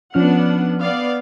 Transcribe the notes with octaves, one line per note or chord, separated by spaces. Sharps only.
F3 B3 C#4 D4 F#5 F6
B3 D5 F5